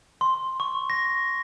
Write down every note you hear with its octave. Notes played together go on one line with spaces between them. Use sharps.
C6
C#6
A#6